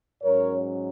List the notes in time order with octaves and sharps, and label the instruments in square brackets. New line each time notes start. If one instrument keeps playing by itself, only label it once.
[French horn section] G#2 F#3 C#4 A#4 C#5